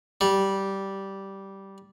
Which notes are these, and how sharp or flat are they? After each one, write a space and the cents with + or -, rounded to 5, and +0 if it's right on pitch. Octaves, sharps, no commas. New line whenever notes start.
G3 -10